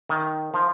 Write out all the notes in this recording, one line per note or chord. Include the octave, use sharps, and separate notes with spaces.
D#3
F3